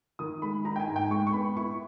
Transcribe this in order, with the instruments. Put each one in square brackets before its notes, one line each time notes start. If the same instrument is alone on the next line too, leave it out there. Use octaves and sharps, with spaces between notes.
[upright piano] D#3 D#6
G#3 B5
D#4 A#5
G5
G#5
G#2
G5
G#3 C#6
C#6
B3 B5
E4 C#6